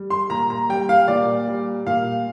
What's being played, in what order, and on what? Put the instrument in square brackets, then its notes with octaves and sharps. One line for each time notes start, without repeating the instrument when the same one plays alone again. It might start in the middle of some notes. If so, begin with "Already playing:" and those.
Already playing: [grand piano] G3
C6
A#2 A#5
A#5
G3 G5
F5
A#2 D5
G3
A#2 F5